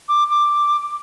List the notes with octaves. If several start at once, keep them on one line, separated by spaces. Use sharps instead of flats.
D6
D6